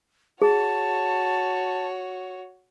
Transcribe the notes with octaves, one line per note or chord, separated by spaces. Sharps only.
F#4 G#4 C#5 A5